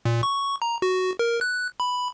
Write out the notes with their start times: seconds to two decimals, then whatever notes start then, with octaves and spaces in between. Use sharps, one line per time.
0.05 A#2
0.23 C#6
0.62 A#5
0.82 F#4
1.19 A#4
1.41 F#6
1.80 B5